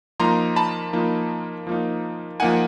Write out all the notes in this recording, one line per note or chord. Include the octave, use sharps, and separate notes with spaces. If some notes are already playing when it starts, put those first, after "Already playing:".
F3 A#3 D#4 A#5 C6
A5 B5
F3 A#3 D#4
F3 A#3 D#4
F3 A#3 D#4 F#5 G#5